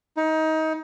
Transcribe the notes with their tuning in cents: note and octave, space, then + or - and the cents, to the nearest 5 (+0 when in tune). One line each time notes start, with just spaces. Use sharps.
D#4 +25